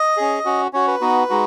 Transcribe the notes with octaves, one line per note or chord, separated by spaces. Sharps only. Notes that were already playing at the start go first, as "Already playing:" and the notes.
Already playing: D#5
C#4 G#4
C#4 F#4
C#4 F#4 C#5
B4
B3 D#4 F#4
G#3 D#4 F#4